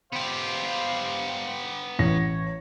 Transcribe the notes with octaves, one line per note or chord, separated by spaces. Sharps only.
B3 G4 C5 F5
A1 C#5 A#6